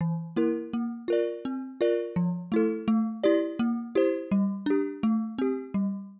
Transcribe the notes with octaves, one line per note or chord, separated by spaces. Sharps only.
E3
A#3 E4 A#4
A#3
F4 A#4 D5
C4
F4 A#4 D5
F3
A3 E4 A4
A3
E4 G4 D5
A#3
E4 G4 C5
G3
D4 G4
A3
C4 G4
G3